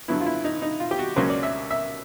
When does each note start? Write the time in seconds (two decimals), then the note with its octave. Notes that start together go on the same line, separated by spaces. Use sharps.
0.08 G2 D3 F#3 B3 E4
0.21 F4
0.26 E4
0.44 D#4
0.62 D#4
0.80 F4
0.91 G4
0.99 F#4
1.16 C#2 C#3 F#3 A#3 C#4 C5
1.30 D5
1.43 E5
1.71 E5